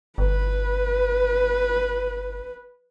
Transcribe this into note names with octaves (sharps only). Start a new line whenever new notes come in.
G1 B4